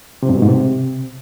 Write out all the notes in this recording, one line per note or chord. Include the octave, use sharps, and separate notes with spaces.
C3
G2
B2
G#2
C3